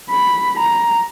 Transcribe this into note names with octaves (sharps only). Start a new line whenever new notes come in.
B5
A#5